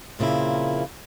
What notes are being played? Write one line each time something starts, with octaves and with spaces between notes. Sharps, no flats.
F2 A#2 C#3 A#3 E4